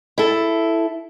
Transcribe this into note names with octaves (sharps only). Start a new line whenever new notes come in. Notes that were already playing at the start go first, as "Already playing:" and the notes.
E4 A4